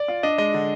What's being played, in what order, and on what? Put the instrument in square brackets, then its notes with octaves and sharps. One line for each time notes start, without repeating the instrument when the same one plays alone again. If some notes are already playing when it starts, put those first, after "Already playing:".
Already playing: [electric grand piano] D5
[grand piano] F4
[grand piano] D4 [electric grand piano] D#5
[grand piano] G#3 [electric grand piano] D#5
[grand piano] D3